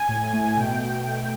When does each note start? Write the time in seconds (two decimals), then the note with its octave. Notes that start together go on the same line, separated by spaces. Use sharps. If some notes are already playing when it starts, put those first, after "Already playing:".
Already playing: G#5
0.08 A2
0.33 A3
0.57 B2 G5